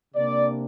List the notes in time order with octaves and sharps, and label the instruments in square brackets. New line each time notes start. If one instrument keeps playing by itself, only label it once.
[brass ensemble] C3 A#3 D4 D5